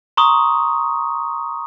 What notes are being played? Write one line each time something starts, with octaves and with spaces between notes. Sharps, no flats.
A#5 C6 C#6 D#6